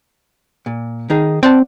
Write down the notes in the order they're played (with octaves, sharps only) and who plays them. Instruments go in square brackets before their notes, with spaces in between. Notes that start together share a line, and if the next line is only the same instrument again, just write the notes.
[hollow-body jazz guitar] A#2
D#3 D#4 G#4
[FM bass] C4 [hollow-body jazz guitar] D5 F#5 A5